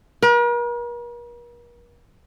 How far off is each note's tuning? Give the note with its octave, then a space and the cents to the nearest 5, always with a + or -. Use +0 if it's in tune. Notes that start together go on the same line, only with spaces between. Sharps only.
A#4 +45